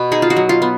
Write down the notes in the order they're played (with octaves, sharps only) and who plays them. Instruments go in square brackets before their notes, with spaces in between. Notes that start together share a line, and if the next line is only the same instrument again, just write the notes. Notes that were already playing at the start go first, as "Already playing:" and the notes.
Already playing: [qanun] B2 B3 F#4
D#4 G#4
F4
F#4
F#3
F4
B3